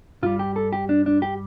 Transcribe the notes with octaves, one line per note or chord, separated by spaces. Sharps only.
G2 G3 F4
G4
A4
G4
D4
D4
G4